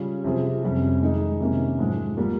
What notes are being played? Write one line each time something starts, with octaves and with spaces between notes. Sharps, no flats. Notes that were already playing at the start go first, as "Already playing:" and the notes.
Already playing: C#3 G3 C#4 F4
C3 F3 C4 F4 G#4
F2 C3 G3 C#4
D#3 G#3 D#4 G#4
C3 D#3 A#3 C#4
G#2 F3 G#3
G3 A#3 F4